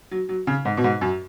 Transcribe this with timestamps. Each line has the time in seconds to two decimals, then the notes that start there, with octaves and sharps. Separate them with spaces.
0.11 F#3
0.29 F#3
0.47 C#3
0.65 G#2
0.77 B2
0.84 G#2
1.01 F#2